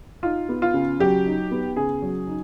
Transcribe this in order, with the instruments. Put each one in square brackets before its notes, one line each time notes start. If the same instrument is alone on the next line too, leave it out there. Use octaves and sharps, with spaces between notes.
[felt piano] D#4 [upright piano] F4
[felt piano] B3
[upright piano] F4
[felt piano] C#3
[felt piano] F#3 [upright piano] G4
[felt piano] D#4
B3
[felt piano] C#3 [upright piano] G#4
[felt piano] F#3
D#4